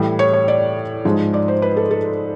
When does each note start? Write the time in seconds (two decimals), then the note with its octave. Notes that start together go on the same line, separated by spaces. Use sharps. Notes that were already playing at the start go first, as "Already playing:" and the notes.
Already playing: A2 E3 G3
0.19 C#5
0.34 C#5
0.48 D5
1.05 G#2 F3 G#3
1.34 D5
1.48 C5
1.62 B4
1.77 A4
1.91 A4